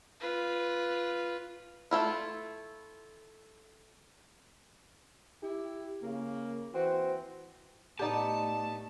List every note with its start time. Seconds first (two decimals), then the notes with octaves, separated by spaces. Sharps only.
0.20 F4 B4
1.91 A3 E4 F4
5.43 E4 G4
6.03 C#3 A#3
6.74 E3 C4 F#4
7.99 A2 A3 B3 D#4 G4 D5 A5